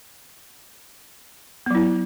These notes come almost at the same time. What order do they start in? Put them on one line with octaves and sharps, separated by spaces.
B3 F#3 E4